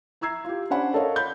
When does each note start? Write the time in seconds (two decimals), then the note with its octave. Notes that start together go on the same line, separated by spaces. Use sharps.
0.21 E4 A#5 E6 G#6 C7
0.44 F4 G4
0.70 C#4 D4 C5 D5 F#5 B5
0.94 A4 A#4 C#5 D#5 F5
1.16 B5 G6